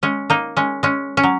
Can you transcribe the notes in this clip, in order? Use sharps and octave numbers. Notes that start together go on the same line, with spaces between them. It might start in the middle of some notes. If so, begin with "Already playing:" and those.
G#3 C#4
A#3 D#4
G#3 C#4
G#3 C#4
C#4
F#3